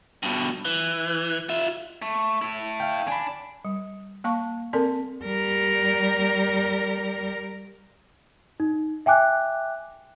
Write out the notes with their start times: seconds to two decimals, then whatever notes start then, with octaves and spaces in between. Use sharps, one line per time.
0.23 G2 B2
0.65 E3
1.49 F4 E5
2.02 A3
2.42 E4 A4
2.80 F5 G5
3.08 D4 G#5 B5
3.65 G3
4.24 A#3 F5 A5 C#6
4.73 C4 A4 A#4 D5 A5 C6
5.25 G3 A#4
8.60 D#4
9.06 E5 G5 G#5 D6 F#6